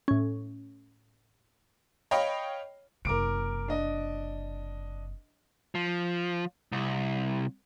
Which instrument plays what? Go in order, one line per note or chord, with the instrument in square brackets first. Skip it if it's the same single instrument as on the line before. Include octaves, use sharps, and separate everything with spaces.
[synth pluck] A2 C#4
[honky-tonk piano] C#5 D#5 F5 G5 B5
[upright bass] F#1 C3 [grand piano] A#4 D6 D7
[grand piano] D4 D#5
[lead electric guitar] F3
C2